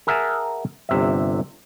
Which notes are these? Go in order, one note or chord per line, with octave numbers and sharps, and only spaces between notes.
G#4 A#4 E5 F#5 G#5 A5
G1 C3 E5